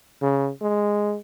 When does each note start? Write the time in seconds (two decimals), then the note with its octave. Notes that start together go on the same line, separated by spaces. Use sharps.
0.22 C#3
0.62 G#3